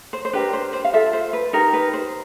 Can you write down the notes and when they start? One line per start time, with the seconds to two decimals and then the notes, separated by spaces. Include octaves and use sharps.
0.13 C5
0.25 C5
0.33 D4 G4 A#4 B4
0.53 C5
0.73 C5
0.84 F5
0.93 F4 A4 E5
1.13 C5
1.33 B4
1.53 D#4 G4 A#4
1.73 B4
1.93 C5